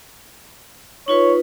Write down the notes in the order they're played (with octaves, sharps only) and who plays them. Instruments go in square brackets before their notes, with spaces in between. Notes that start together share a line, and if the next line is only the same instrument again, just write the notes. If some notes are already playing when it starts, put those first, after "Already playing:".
[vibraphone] D#4 F4 B4 [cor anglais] C#5